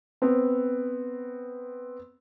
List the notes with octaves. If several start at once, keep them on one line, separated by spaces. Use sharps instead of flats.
B3 C4